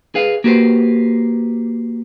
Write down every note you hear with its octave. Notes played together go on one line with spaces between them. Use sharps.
G#4 B4 F5
A#3 F#4 G4 B4 C5